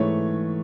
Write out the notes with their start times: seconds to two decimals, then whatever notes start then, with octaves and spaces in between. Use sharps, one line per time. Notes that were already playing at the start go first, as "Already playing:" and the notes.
Already playing: G#2 E3 A3 C#5